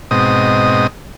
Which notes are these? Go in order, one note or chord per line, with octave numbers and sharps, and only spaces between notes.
G#2 B2 C4 D#5 D#6